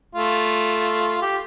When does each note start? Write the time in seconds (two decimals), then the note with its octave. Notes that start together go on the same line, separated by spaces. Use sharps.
0.15 A3 F4
1.22 G4